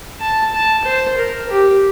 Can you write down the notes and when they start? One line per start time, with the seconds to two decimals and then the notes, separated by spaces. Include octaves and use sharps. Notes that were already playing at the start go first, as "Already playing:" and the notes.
0.20 A5
0.53 A5
0.84 C5
1.18 A#4
1.49 G4